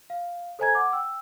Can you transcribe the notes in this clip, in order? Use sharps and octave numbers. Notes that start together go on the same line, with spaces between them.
F5
A4 C5 D#5 G#5 A#5 G#6
F#5 D6
G5 E6